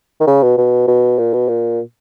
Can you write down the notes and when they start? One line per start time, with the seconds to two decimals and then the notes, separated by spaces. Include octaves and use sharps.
0.20 D#3
0.27 C#3
0.43 B2
0.57 B2
0.88 B2
1.18 A#2
1.33 B2
1.48 A#2